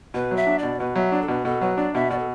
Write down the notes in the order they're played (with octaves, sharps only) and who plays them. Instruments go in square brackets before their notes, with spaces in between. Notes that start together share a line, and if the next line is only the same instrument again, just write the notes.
[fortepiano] B2 [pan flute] B4
[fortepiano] F#3
[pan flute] E5
[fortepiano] D4
[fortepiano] B2 [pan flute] D5
[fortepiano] B2 [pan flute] B4
[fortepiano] F#3 [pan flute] E5
[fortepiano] D4 [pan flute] D5
[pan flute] A4
[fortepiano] B2 [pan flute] B4
[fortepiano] B2 [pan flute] A4
[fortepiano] F#3 [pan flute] B4
[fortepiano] D4 [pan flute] D5
[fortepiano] B2 [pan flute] E5
[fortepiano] B2 [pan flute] D5
[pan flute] A4